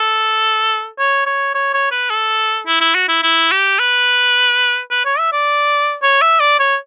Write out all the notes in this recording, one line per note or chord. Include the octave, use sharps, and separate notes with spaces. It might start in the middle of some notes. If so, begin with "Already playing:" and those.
Already playing: A4
C#5
C#5
C#5
C#5
B4
A4
E4
E4
F#4
E4
E4
G4
B4
B4
C#5
E5
D5
C#5
E5
D5
C#5